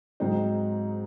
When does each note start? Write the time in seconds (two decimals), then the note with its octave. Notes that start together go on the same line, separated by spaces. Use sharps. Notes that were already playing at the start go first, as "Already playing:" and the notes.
0.20 G#2 F#3 C4 D#4